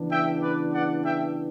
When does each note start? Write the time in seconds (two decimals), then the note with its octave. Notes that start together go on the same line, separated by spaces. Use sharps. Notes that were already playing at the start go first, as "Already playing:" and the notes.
Already playing: C#3 E3 B3 D4
0.10 E5 G5
0.41 B4 D5
0.72 D5 F#5
1.03 E5 G5